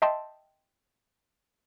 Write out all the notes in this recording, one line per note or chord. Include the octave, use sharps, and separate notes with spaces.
D#5 E5 G5 A5 C6